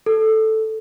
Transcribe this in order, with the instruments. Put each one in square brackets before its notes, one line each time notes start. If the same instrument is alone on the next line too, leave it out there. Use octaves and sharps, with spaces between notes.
[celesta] A4